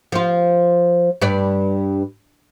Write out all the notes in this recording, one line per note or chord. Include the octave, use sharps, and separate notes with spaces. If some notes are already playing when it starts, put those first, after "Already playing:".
F3 F4
G2 B4 D5